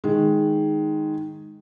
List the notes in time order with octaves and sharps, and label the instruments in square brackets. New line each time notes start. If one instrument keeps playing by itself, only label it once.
[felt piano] D#3 G#3